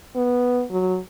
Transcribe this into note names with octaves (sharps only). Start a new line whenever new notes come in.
B3
F#3